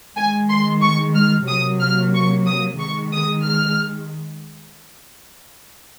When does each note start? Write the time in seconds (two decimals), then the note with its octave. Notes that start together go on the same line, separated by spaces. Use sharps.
0.16 D#3 G#3 G#5
0.49 C6
0.82 C#6
1.15 F6
1.47 C3 F#3 A#3 D#6
1.81 F6
2.14 C#6
2.46 D#6
2.79 D#3 G#3 C#6
3.13 D#6
3.45 F6